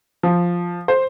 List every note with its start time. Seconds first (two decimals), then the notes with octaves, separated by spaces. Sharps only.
0.23 F3
0.88 C5